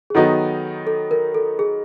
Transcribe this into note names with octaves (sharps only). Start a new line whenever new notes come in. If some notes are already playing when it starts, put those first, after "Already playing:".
G#4
D#3 F#3 B3 D#4 A4
A4
A#4
A4
G#4